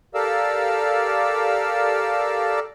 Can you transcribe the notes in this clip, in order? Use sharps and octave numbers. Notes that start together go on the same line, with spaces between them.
G4 A4 A#4 D5 F5 E6